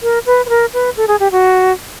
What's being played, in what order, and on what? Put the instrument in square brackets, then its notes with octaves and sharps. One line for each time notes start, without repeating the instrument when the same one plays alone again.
[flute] A#4
B4
B4
A#4
B4
A4
G#4
G4
F#4